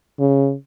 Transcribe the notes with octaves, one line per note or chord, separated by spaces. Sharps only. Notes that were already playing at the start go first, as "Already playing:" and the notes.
C#3